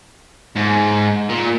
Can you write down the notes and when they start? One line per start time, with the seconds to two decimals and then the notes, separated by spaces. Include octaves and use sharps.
0.56 G#2
1.29 A#2